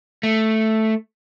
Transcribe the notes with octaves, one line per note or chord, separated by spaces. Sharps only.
A3